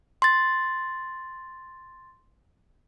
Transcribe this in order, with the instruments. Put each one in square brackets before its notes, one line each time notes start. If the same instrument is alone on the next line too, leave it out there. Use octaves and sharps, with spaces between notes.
[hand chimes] C6 A6